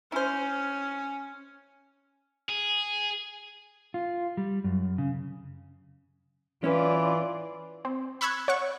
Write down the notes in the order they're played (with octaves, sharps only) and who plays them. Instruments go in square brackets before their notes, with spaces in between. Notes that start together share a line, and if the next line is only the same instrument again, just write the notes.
[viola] C#4 [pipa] E4 C5
[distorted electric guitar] G#4
[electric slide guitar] F4
G3
F#2
C#3
[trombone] E3 [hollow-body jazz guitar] C#4 E4 B4 [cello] F4 D5
[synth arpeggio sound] C4
B5 C#6 E6 F#6 G#6
C#5 F#5 C#6